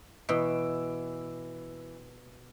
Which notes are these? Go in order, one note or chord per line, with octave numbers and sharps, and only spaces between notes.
B2 E3 E6 D7